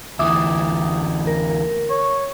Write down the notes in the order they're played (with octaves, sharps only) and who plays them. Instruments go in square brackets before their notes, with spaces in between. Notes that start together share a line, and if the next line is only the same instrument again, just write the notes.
[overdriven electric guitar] D2 E3 [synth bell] E5 D6 D#6
[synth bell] A#4
[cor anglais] C#5